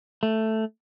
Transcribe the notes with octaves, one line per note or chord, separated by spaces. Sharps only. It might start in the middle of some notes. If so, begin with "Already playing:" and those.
A3